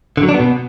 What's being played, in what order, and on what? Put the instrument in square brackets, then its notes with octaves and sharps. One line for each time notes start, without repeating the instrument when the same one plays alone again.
[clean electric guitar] D3
F#3
D4
B3
B2